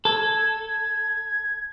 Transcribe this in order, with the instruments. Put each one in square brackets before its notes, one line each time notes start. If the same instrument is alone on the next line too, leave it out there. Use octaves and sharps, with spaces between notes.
[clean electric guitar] A4 [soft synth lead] G#6